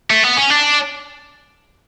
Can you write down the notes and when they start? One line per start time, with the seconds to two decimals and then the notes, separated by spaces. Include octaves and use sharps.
0.10 A3
0.24 B3
0.37 C#4
0.50 D4